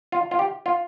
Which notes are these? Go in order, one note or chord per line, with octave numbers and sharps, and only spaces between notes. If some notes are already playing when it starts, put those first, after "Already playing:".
F4
F4
G4
F4